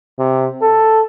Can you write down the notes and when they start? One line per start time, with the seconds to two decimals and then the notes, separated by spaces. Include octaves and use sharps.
0.19 C3
0.62 A4